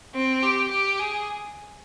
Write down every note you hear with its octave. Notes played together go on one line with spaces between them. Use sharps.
C4
G4
G4
G#4